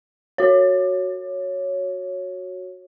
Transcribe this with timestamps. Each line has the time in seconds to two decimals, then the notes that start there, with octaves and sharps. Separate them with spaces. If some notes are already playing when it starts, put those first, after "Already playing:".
0.38 F#4 C#5